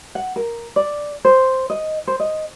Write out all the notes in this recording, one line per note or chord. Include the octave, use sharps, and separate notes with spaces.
F#5
A#4
D5
C5
D#5
C5
D#5